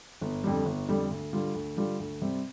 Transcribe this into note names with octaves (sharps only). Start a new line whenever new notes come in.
G1
F2 D3 G3
G1
F2 D3 G3
D2
D3 G3 F4
D2
D3 G3 F4
D2
C3 G3 C4